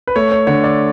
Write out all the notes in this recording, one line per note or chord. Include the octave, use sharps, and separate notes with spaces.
B4
A3 C#5
C#5
D3 C#5
D5